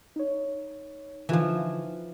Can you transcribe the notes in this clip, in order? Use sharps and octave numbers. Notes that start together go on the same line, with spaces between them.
D#4 C#5
D3 E3 F3 D#4 F4